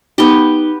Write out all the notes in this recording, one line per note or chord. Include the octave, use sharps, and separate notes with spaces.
B3 D#4 G4 G7